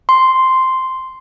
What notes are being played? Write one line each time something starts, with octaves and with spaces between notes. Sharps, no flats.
C6